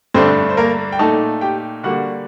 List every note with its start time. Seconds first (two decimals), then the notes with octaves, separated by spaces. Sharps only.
0.14 G2 D3 A3 C4 D4 C5
0.49 C5
0.57 A#3 A#4
0.92 G5
0.99 A#2 A3 D#4 A4 A5
1.41 G4 G5
1.83 D3 G3 A#3 F#4 F#5